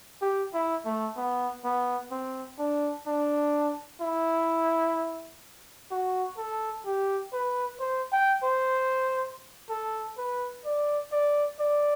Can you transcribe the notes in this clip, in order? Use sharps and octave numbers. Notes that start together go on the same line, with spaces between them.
G4
E4
A3
B3
B3
C4
D4
D4
E4
F#4
A4
G4
B4
C5
G5
C5
A4
B4
D5
D5
D5